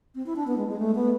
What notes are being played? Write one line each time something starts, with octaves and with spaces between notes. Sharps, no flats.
C4
E4
D4
B3
G#3
G#3
A3
B3